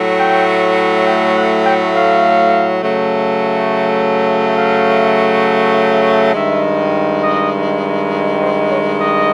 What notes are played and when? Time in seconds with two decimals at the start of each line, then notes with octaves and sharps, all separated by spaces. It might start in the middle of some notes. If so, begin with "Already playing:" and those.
Already playing: A2 F#3 A3
0.18 G5
1.05 G5
1.35 F#5
1.64 G5
1.94 F5
2.82 C#3 F#3 A3
4.58 F5
6.34 G2 D#3 G#3 E5
7.23 D#5
8.39 C5
8.69 C#5
8.99 D#5